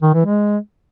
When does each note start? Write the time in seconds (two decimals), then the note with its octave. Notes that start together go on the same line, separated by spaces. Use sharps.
0.02 D#3
0.14 E3
0.26 G#3